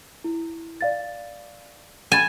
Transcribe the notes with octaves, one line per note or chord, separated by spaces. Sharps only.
E4
D5 F5 A6
G#5 B5 A6 E7